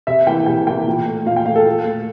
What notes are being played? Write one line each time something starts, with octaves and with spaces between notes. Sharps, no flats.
C3 E5
E3 A#3 G5
C3 G5
E3 A#3 G5
A#2
A3
A#2 F5
G5
A3 F5
A4
A#2
A3